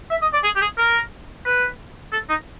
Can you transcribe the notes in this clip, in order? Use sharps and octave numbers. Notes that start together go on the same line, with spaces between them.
E5
D#5
D5
G#4
G4
G#4
A#4
B4
A4
D#4